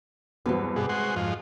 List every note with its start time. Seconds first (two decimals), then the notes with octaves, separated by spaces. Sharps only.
0.46 E2 G2 F#3 B3 C4
0.76 G2 B2 G#4
0.89 G#3 F#4 C5
1.16 F2 G#2 F3